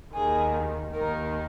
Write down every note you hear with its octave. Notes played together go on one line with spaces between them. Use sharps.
D#2 D#3 G#4
D#2 D#3 A#4